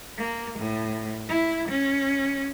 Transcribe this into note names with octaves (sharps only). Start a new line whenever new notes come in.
A#3
A2
E4
C#4